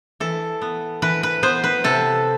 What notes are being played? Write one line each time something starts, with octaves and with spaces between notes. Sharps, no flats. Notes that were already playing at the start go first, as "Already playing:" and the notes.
E3 A4
B3
E3 B4
B4
B3 C5
B4
C3 A4